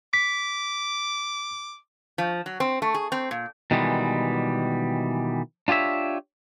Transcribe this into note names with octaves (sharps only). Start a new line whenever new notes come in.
D6 B6
F3
F#3
C4
A3
G#4
C4
A#2
B2 D#3 E3 G3 G#3
D4 F4 G4 C#5 E5